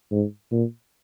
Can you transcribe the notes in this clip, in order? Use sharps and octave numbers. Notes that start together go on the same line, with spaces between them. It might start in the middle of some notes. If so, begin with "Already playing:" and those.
G#2
A#2